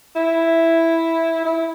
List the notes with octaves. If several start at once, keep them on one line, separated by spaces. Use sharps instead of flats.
E4
E4